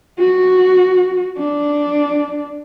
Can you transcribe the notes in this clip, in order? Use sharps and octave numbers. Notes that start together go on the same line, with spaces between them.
F#4
D4